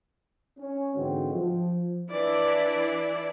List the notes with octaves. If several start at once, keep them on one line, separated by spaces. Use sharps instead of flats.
C#4
G#2 D3 E3 G#3 C4 F#4
F3
E3 D4 E4 D5